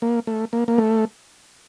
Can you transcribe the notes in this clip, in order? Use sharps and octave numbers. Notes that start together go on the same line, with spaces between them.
A#3
A3
A#3
A#3
A3